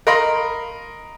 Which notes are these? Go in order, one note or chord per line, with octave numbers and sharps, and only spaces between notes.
A#4 D#5 F5 B5 C6 A#6